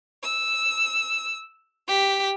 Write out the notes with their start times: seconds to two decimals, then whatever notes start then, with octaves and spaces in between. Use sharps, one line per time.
0.23 E6
1.88 G4 B6